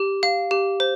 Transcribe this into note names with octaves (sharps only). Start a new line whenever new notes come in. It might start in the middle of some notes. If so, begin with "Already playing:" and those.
Already playing: G4
F5
G4
C5